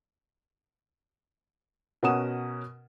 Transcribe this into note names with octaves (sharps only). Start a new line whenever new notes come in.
B2 C#4 A#4 F#5 D#6 E7